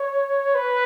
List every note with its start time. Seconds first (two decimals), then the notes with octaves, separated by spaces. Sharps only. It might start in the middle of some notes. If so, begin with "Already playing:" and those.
Already playing: C#5
0.55 B4